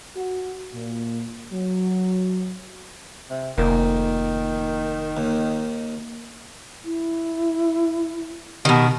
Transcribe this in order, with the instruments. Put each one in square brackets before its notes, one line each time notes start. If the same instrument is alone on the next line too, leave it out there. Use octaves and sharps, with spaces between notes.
[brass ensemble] F#4
A#2
F#3
[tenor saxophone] C3
[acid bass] F1 [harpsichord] A#2 [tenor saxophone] D#3
[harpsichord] D#2
[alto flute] E4
[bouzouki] B2 D#3 [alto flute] G4